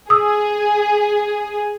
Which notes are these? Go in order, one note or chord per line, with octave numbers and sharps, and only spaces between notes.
G#4 D#6 E6